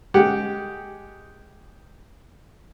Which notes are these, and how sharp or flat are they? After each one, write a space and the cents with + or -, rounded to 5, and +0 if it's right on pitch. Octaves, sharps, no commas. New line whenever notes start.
G#3 +5 G4 +0 F#5 +0